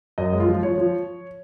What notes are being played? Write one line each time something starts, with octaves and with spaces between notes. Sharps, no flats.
F#2 D#5
G#3
F4
F3
F3 C#5
F3